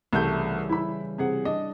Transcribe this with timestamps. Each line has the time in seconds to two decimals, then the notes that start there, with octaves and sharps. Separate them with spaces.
0.13 C2 C#3 E3 G3 A3 G6
0.69 E4 B5
1.18 C3 G#4 F#5
1.45 D4 D#5